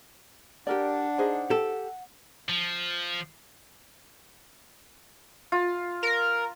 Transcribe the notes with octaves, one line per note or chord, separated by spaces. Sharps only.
D4 G4 A#4 D5 F#5
D#4 G#4 C5
G4 A4
F3
F4
A#4